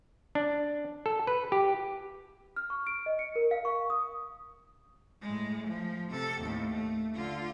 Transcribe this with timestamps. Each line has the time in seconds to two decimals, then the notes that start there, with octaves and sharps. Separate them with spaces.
0.35 D4
1.06 A4
1.27 B4
1.52 G4
2.56 F6
2.70 C#6
2.87 D7
3.06 D#5
3.19 C#7
3.36 A#4
3.51 F5
3.65 C#6
3.90 D#6
5.22 A2 G#3
5.68 F3
6.10 C3 A4
6.42 D#2 A2
6.73 A3
7.15 D3 F4